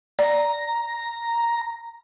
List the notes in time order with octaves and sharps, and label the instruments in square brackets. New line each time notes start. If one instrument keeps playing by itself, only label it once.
[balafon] D5 [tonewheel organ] A#5